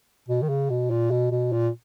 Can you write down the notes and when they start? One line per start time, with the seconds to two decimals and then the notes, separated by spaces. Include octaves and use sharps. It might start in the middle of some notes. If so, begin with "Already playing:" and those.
0.28 B2
0.42 D#3
0.49 C#3
0.70 B2
0.90 A#2
1.11 B2
1.31 B2
1.53 A#2